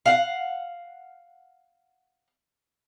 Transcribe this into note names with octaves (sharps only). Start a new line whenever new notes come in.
F5 F#5